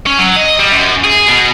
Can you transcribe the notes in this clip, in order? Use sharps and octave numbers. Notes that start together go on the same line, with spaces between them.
C#4
F#3
D#5
G3
F#2
G#4
B2